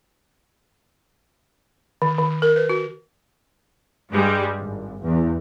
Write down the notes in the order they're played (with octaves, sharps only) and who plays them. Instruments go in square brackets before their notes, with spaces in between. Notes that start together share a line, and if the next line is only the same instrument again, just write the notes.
[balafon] D#3
D#3
A#4
B4
F#4
[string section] G2 G3 G#3
G#1
E2